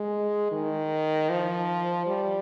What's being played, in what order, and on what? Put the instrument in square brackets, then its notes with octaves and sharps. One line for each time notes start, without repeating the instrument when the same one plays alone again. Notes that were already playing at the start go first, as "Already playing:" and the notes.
Already playing: [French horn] G#3
D#3
F3
G3